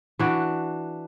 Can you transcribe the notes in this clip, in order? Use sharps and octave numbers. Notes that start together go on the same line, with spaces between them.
E3 D4 F#4